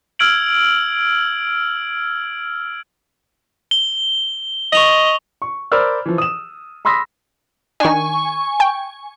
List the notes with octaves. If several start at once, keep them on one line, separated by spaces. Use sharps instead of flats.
E6 F6 G#6 D7 F#7
G7
D#5 C#6 F7 F#7
C#6
A#4 C5 D5 B5 E6 F6
E3 F3
D#6 E7
B5 C6 D#6 E6 A#6 B6
D#3 D4 G#5 C#6
G5